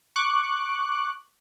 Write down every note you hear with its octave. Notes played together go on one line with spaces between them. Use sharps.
C#6 D6 F#6